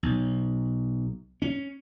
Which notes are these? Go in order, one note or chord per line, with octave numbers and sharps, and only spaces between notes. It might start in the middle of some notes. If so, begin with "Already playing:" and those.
B1
C#4